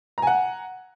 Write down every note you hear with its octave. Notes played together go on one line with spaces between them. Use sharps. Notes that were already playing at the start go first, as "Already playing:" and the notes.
F#5 G#5 A#5